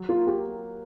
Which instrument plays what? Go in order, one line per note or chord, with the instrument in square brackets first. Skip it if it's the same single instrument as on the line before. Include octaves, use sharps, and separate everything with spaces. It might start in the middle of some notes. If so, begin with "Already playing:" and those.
Already playing: [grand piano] F#3
[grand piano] A#3 [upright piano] F4
[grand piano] A#3 [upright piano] G4